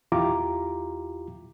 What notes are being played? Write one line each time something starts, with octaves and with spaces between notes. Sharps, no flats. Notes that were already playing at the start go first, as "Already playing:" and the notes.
E2 E4 F4 G4 A#5 D6